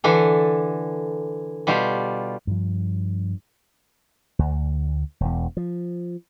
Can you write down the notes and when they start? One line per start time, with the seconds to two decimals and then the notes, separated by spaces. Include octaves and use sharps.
0.04 D3 E3 D4 A4
1.67 B2 G3 F4 G4
2.47 G2 F3
4.39 D2
5.21 E1 E2
5.57 F3